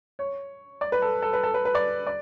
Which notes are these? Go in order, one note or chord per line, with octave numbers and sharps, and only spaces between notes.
C#5
D5
B4
A4
A4
B4
A4
B4
B4
D5
D5